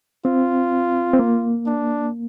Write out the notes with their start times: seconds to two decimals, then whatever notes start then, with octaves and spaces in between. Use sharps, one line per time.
0.25 C4 F4
1.14 C4
1.19 A#3
1.66 D4